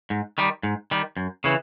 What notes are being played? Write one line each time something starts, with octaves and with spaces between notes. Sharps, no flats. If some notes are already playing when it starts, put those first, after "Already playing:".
G#2
D#3 G3
G#2
D#3 G3
F#2
C#3 E3